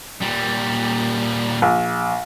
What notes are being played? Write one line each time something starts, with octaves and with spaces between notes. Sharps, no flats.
A#2 G3
A#1